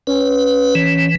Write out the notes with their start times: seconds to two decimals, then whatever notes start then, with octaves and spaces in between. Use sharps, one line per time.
0.07 C#4 B4
0.75 E3